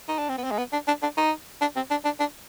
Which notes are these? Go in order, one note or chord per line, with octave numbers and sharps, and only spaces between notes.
D#4
D4
C4
B3
C4
G#3
B3
D4
D4
D4
D#4
D4
C4
D4
D4
D4